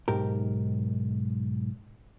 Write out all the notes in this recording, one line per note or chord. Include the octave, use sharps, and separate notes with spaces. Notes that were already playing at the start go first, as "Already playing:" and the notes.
B1 G#2 G4 A#4